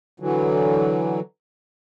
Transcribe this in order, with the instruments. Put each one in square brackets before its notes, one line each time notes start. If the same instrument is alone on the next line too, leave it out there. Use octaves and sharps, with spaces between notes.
[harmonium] D3 E3 F#3